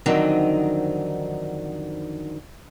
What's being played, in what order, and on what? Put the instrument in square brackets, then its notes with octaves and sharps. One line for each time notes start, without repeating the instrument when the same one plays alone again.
[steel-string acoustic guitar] F2 D3 D#3 F#3 C4 D#4